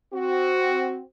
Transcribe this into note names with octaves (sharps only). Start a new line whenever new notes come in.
C4 F#4